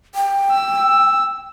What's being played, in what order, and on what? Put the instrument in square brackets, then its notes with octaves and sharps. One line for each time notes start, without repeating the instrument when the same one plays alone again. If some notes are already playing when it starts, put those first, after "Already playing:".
[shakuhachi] G5
[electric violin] E6